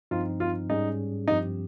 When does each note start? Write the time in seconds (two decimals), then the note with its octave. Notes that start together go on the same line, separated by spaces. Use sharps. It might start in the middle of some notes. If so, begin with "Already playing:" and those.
0.11 G2 F3 C4 D#4 F4
0.40 F4
0.69 G#2 G3 C#4 D#4 G#4
1.28 G2 F3 C4 D#4 G4